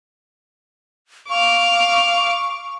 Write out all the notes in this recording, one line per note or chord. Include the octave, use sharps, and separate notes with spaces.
F5 C#6 D6